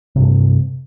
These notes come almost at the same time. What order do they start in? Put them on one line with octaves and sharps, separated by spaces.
C3 G2 A3